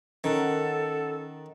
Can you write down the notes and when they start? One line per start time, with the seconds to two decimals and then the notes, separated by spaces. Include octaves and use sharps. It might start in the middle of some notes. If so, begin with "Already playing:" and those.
0.24 D#3 C#4 A4 A#4 F#5